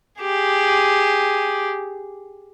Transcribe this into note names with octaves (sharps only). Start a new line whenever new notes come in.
G4 G#4